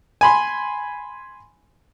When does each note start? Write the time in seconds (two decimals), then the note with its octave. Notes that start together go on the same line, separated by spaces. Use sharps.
0.21 G#5 B5 C6